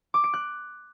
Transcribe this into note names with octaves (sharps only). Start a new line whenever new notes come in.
D6
D7
F#6